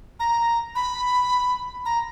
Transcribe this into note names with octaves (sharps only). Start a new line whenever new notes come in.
A#5
B5
A#5